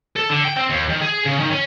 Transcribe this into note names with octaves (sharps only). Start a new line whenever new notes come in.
A4
D3
G5
C4
D#2
D#3
G#4
C#3
D#3
C#4